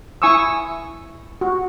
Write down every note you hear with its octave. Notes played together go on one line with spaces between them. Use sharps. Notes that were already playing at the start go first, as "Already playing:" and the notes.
E4 G#5 C#6 D#6 E6
F#4